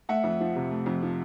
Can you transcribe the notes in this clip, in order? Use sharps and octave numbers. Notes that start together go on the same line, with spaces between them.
A3 E5 F#5
F2
F3
C3
A3
F2
F3